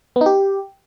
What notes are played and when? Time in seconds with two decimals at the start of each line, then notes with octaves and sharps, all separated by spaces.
0.16 B3
0.21 D#4
0.26 G4